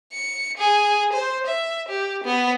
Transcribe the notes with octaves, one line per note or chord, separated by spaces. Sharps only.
C#7
G#4
C5
E5
G4
B3